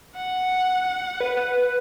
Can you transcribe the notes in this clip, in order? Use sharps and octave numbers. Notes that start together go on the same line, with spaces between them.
F#5
B4